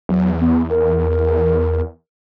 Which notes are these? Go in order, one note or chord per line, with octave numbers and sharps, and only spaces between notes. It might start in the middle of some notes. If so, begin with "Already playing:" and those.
E2 F#3
B3
A#4